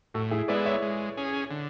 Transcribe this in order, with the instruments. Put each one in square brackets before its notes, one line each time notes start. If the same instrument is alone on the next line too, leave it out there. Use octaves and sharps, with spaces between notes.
[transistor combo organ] A2 [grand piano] F#4 A4
[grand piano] E4 G#4
[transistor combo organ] G#3 B3 E4 [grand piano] B4 D5
[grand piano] C#5 E5
[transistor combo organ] G#3
C#4 G#4
D3